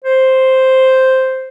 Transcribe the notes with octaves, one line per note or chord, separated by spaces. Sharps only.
C5